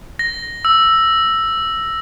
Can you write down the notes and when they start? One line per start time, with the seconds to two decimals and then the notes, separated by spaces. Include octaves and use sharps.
0.19 A#6
0.65 E6